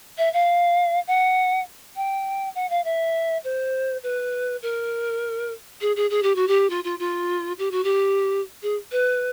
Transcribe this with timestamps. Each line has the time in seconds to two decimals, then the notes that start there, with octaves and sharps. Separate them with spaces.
0.18 E5
0.33 F5
1.07 F#5
1.96 G5
2.55 F#5
2.70 F5
2.84 E5
3.44 C5
4.03 B4
4.62 A#4
5.81 G#4
5.96 G#4
6.10 G#4
6.23 G4
6.36 F#4
6.48 G4
6.70 F4
6.84 F4
6.99 F4
7.59 G4
7.71 F#4
7.84 G4
8.62 G#4
8.92 B4